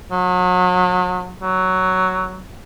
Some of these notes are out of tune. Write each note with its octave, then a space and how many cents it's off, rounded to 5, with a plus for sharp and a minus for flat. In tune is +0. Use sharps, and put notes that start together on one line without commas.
F#3 -35
F#3 +10